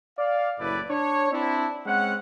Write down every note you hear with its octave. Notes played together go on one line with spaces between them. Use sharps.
D5 F5
F#1 A2 E4 B4 D5
D4 C#5
C4 D4 E4
G#3 C4 C#4 F#5